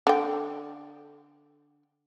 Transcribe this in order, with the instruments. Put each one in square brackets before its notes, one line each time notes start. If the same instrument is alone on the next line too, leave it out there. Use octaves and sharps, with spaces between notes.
[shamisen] D3 G5